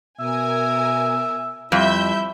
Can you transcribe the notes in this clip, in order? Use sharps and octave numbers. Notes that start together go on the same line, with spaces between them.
B2 A#4 E5 G#5
F2 G3 E4 E5 G6